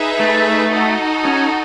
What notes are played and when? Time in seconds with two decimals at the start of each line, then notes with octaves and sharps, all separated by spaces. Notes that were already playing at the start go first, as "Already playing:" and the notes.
Already playing: D#4 G#4 B4 E5
0.19 A3
0.73 D#4 F#4 A4 D#5
1.25 C#4